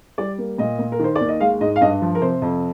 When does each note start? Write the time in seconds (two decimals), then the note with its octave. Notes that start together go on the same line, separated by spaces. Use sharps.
0.18 G3 D5
0.38 A#3
0.58 A#2 D#5
0.79 A#2
0.92 A#4
0.99 D#3 C5
1.16 D5
1.21 D#2
1.29 D#5
1.40 G#3 F5
1.61 G#2 D#5
1.76 F5
1.81 G2 D#5
2.02 F3
2.15 A#4
2.21 C3 C5
2.42 F2